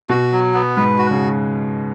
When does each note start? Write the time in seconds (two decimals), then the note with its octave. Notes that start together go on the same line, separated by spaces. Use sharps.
0.09 B2 F#4
0.32 F#3
0.54 B3
0.76 G#2 B4
0.98 F#4
1.11 C#3